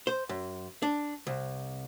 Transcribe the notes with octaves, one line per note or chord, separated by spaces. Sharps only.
C5
F#2
D4
C2